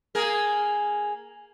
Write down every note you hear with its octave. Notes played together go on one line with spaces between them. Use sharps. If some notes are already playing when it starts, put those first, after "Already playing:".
A#3 G#4 A#4